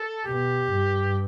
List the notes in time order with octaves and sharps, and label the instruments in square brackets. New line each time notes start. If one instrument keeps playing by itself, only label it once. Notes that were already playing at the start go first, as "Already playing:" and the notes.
Already playing: [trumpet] A4
[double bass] B2 [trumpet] G4
[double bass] G2